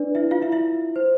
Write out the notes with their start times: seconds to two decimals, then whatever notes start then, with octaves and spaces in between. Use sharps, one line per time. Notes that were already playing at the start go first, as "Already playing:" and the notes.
Already playing: D4 B4 D5
0.15 E4 E5
0.31 F4 F5
0.42 E4 E5
0.52 E4 E5
0.96 C5